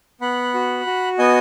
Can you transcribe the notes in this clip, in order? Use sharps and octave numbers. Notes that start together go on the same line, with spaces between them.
B3 F#5 B5
F#4
F#4
B3 D#5 G#5